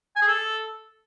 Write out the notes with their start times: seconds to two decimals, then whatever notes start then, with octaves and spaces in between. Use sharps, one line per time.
0.16 G#5
0.22 G#4
0.28 A4